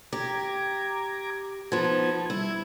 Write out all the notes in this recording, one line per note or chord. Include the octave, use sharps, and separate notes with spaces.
G4 A#5 D6 G#6
F3 B3 D#4 A5 G#6
G3 E4 G#6